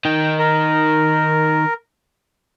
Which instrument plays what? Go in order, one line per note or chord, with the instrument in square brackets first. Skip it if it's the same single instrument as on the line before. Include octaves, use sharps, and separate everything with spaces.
[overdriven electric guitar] D#3 D#4 [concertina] G5
[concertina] A#4